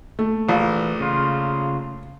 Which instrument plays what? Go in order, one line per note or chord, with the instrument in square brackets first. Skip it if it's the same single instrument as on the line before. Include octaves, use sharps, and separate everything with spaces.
[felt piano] A3
[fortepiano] A#1 [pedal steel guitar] E3
[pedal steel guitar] C#3 F4